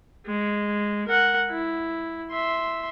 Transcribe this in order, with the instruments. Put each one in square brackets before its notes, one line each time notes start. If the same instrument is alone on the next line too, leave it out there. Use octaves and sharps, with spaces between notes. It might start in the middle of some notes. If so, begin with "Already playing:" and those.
[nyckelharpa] G#3
A#4 F#5
E4
E5 C6